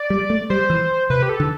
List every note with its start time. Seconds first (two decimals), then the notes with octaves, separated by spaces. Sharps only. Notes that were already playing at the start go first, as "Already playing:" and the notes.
Already playing: D5
0.10 G3
0.30 A3
0.50 G3 C5
0.70 E3
1.10 C3 B4
1.22 G4
1.29 A4
1.40 D3